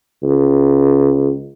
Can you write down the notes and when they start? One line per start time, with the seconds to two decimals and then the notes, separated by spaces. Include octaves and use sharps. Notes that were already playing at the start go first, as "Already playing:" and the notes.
0.23 C#2